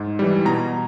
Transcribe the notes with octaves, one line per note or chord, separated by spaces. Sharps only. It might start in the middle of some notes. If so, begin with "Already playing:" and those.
Already playing: G#2
E3 G3
B2 A#5